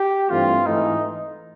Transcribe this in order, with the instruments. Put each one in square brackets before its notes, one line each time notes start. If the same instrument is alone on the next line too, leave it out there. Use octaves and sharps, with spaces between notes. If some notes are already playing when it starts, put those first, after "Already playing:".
Already playing: [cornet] G4
[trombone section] G2 E3 A3 C4 [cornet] F4
[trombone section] G#2 E3 A3 [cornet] D#4